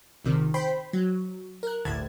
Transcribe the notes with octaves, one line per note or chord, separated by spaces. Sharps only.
A#1 C3 D#3
C5 G5 B5 C6
F#3
A#4 F#6
G1 D2 A2 A5 G#6